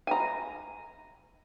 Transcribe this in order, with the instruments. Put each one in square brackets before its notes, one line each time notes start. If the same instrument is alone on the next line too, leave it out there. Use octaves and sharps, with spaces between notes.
[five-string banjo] G#5 A#5